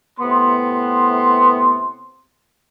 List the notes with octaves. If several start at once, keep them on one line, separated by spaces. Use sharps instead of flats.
A2 C3 B3 C6